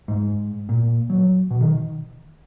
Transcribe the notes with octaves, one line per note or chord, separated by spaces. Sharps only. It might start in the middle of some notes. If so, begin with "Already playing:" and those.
G#2
A#2
F#3
B2
D#3